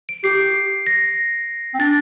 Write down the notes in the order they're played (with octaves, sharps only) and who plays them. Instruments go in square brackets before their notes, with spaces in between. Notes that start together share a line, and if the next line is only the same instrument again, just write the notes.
[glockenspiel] D7
[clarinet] G4 [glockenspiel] C7
[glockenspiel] A#6
[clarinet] C4
[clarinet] D4 [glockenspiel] A6